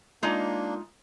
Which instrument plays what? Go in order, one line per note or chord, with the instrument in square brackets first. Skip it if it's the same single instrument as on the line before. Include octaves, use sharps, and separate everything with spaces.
[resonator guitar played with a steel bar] G#3 D#4 F4 [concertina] A#3 D4